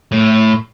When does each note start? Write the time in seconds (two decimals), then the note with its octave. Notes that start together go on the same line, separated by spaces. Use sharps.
0.12 A2